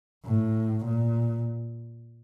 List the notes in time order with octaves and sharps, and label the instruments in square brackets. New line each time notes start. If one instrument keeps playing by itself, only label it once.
[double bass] A2
A#2